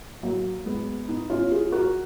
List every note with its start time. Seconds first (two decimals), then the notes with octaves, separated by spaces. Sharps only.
0.23 F#3 A#3
0.66 G#3 B3
1.08 B3 D#4
1.30 C#4 F4
1.51 F4 G#4
1.72 F#4 A#4